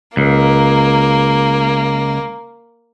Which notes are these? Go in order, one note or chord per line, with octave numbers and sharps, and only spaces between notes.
C#2 A#3